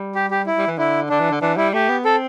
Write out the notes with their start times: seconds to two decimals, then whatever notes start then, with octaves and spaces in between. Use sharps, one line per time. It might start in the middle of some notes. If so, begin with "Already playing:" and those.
Already playing: G3
0.15 G4
0.31 G4
0.46 E4
0.57 G3
0.68 E3
0.78 D3 E4
1.09 D3 D4
1.20 E3
1.31 D3
1.41 E3 D4
1.57 G3 E4
1.73 A3 G4
1.89 B3
2.05 C4 A4